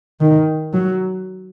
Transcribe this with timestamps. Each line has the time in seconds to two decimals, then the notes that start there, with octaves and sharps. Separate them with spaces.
0.20 D#3
0.73 F#3